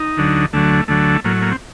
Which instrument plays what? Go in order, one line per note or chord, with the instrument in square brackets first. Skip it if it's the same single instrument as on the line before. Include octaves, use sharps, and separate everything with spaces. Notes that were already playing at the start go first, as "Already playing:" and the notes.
Already playing: [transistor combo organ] D#4
D2 D3 F#3
D2 D3 F#3 A3
D2 D3 F#3 A3
A2 F#3 A#3
A#3
C4